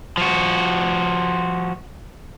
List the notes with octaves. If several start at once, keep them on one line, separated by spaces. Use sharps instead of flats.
F3 F#4